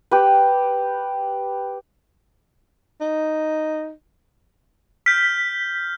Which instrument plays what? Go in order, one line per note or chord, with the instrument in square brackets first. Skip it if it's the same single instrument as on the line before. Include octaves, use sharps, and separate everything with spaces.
[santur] G4 B4
[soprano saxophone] D#4
[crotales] F6 G6 [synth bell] B6